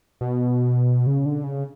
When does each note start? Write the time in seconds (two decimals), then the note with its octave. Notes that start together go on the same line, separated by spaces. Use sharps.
0.21 B2
1.07 C#3
1.26 D3
1.44 C#3